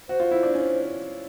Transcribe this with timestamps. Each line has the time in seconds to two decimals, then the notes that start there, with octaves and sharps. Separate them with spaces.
0.09 F#4 C5
0.20 F4
0.31 E4
0.43 D4
0.54 C#4